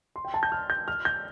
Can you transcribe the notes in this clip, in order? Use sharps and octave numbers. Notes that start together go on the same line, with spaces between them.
C6
G5
A5
G6
F6
G6
F6
G6